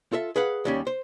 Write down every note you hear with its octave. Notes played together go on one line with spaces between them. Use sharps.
F4 A4 E5
G#4 B4 F5 F#5
D#2 G3 C#4
C5